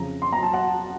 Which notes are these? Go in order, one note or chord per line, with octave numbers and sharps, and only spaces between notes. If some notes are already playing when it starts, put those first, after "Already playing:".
Already playing: F2 C#3 A#5
C6
A#5
A5
F#5